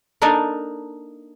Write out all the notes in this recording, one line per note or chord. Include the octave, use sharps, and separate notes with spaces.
A#3 D4 D#4 A4 A#4 D#5